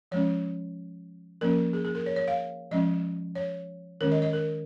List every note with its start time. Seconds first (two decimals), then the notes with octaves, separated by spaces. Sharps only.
0.11 F3 G#3 C#4 C#5
1.41 F3 A#3 C#4 A#4
1.73 G#4
1.85 G#4
1.95 A#4
2.06 C#5
2.16 C#5
2.28 F5
2.71 F3 G#3 C#4 D#5
3.35 C#5
4.01 D#3 G#3 C#4 A#4
4.12 D#5
4.22 D#5
4.33 A#4